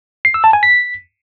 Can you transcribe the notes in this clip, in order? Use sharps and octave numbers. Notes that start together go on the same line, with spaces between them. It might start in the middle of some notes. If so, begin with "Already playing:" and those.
C7
E6
A5
G#5
B6